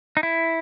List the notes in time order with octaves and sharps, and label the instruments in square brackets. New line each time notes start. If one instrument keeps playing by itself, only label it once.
[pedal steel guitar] D#4
E4